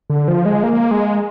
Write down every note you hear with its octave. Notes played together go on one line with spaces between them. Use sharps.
D3
F3
G#3
A#3
G#3